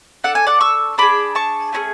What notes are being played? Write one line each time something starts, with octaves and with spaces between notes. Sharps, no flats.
D4 A4 F#5
G#5
D5 F#5
C#6 E6
D4 G#4 B5 D6
A5 C#6
A3 C#4 E4 G#4